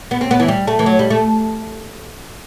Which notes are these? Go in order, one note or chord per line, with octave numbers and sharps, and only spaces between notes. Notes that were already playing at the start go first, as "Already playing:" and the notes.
B3
C4
B3
E3
G3
A3
E3
F#3
G3
A3